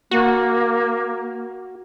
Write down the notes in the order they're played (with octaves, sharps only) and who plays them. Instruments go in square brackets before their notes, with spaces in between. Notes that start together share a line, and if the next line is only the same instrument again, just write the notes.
[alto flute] A#3 [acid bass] F#4